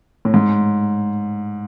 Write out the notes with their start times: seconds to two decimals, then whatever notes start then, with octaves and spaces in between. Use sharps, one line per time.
0.25 A2
0.34 G#2